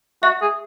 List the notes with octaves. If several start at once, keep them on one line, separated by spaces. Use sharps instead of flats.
F#4 E5
G#4